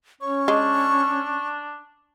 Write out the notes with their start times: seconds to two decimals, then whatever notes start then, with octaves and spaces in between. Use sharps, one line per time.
0.21 C#4 C#5 C#6
0.48 G#3 D4